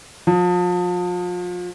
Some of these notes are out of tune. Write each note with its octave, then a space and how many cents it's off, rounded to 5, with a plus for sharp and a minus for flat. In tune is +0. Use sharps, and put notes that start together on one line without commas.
F3 +35